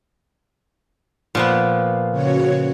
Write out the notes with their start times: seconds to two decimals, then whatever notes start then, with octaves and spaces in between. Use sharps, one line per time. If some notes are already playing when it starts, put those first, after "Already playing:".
1.35 A#2 F3 B3
2.12 C#3 F#4 C#5